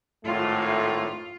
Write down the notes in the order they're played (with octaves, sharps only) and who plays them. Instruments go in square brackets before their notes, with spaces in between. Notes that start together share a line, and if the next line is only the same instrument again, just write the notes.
[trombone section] G#1 A2 A3 [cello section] F4